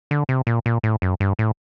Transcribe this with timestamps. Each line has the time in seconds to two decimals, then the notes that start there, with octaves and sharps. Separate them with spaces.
0.11 D3
0.29 C3
0.47 A#2
0.66 A#2
0.83 A2
1.02 F#2
1.20 G2
1.39 A2